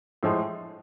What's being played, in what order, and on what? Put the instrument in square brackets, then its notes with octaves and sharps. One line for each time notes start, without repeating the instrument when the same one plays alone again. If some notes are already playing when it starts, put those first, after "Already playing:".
[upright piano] A2 F3 G#3